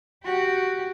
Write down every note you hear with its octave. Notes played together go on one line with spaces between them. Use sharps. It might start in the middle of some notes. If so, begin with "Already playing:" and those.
F#4 G4